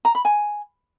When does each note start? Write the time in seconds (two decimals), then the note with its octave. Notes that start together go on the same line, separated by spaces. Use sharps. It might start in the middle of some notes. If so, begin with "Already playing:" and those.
0.05 A#5
0.15 B5
0.25 G#5